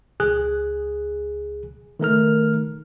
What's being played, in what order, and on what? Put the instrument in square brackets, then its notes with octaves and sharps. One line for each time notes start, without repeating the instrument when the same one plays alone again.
[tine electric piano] C#2 G#4 F#6
D#3 A3 A#4 F6